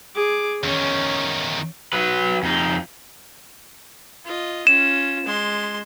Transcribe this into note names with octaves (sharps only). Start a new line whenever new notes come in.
G#4 D6
E2 D#3 C#4
F#3 B4
F2 D#4
F4 D#5
C#4 F4 E7
G#3 C6